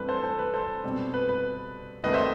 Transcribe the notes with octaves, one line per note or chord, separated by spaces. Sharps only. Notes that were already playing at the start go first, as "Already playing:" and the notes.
Already playing: G2 E3 A3 C4 B4
A4 C5
A4 C5
B4
A4 C5
B2 G3 C4
B4
B4
C2 C3 D#3 A3 B4 D#5
C5 E5